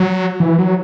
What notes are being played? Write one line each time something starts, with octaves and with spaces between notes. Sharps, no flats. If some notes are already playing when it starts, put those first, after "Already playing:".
Already playing: F#3
E3
F#3